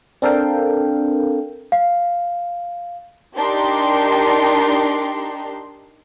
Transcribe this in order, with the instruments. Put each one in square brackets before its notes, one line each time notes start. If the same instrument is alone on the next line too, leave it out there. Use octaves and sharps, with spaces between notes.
[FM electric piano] C4 D4 A4 A#4 F5 G5
[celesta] F5
[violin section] D4 D#4 G4 A#4 C6